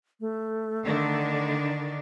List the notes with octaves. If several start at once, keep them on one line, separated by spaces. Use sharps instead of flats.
A3
D3 D#3 D4